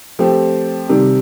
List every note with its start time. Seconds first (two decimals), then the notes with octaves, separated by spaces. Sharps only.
0.19 F3 A3 C4 G4
0.89 C3 D#3 G3